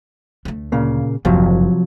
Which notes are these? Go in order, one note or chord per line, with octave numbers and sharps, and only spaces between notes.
D2 A3
A#2 C#3 A#3
F#1 D#2 C3 F3 F#3